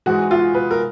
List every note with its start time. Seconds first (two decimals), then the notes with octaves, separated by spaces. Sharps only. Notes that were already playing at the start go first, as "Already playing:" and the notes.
0.06 G#2 E3 G#3 F#4
0.31 F4
0.54 B4
0.71 A#4